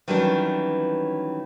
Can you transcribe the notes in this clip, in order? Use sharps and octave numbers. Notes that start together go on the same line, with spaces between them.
D#3 E3 F#3 G3 C#4 D4